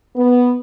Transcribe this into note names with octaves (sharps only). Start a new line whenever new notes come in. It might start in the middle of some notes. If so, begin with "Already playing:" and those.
B3